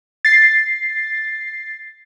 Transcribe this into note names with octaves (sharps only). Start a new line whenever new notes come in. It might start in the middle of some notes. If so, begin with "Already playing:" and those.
A6 C7